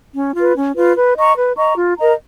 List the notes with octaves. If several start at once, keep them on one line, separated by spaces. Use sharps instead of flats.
C#4
F4 B4
C#4
F4 B4
B4
D#5 A#5 C#6
B4
D#5 A#5 C#6
F4
A#4 D#5 A#5